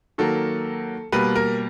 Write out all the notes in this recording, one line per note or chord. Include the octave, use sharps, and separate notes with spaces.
D#3 F#3 A#3 A4
B2 G3 A#3 B4
A#4